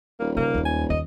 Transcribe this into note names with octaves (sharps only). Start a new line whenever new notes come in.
D#1 A#3
C#3 A#3
D#2 G#3
G#5
D#2 D#5